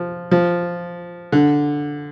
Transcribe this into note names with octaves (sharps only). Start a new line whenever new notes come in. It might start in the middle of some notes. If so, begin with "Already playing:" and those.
Already playing: F3
F3
D3